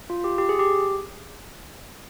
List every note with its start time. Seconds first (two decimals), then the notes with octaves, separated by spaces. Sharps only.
0.10 F4
0.24 G4
0.38 G4
0.49 G#4
0.59 G4